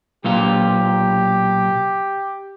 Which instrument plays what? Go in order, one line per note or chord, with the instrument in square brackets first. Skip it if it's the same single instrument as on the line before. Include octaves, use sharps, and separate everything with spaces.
[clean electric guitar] B1 A#2 F4 [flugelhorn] G4